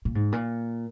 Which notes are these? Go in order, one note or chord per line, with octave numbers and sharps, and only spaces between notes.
A#2
G#2
A#2